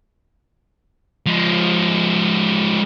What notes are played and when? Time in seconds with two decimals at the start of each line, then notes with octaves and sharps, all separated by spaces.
1.26 F3 G#3